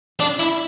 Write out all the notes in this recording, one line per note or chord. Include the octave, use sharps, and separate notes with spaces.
D4
E4